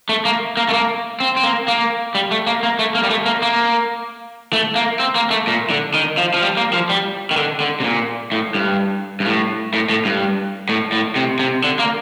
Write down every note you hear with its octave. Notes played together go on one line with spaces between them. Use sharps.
A3
A#3
A#3
A3
A#3
C4
C4
A#3
A#3
G3
A3
A#3
A#3
A3
A#3
G3
A3
A#3
A#3
A3
A#3
C4
A#3
A3
A#2
D3
D#3
F3
F3
G3
A#3
F3
G3
D#3
D3
D3
C3
A#2
A2
G2
G2
A2
A2
A2
G2
A2
A2
C3
C3
D3
A#3